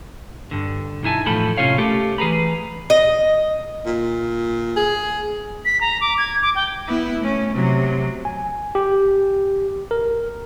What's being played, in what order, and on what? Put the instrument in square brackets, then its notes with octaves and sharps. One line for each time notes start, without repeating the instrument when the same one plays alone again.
[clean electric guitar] G2 D3
B1 D#4 E4 G#5 A5
E2 A2 F3 A4 B5
A2 C3 C#4 F4 C#5 F5
A3 G4 A4 A#4
E3 G#4 B4 A#5 B5
[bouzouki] D#5
[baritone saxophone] A#2
[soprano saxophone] G#4
[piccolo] B6
A#5
D6
G#6
D6
G5
[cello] B3 E4
A3 C#4
C3 F#3
[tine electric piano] G#5
G4
A#4